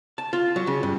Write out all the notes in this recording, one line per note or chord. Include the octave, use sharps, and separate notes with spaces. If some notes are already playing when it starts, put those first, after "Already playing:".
A5
F4
F#3
C#3
G2